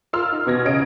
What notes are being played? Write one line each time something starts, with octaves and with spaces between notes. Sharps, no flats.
F4 A#4 C6 E6 F6
D#4
E2 B2 G#6 A#6
C#3 D#5 D7